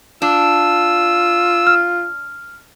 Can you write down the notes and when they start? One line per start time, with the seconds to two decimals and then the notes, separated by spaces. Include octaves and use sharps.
0.22 D4 F4 E6
1.67 F6